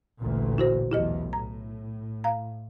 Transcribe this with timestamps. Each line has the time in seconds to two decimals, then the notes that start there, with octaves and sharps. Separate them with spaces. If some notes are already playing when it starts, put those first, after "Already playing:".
0.18 A1 D2 A#2
0.58 E4 F#4 C5
0.92 B1 E2 E4 G4 D#5
1.33 A2 A#5
2.24 F5 A#5